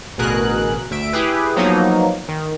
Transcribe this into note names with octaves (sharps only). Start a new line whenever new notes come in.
A1 D2 B2 G#4 A#4 F#6
D2 E5 D7
E4 G4 G#4 B4
F3 F#3 A#3 B3 D#4
D#3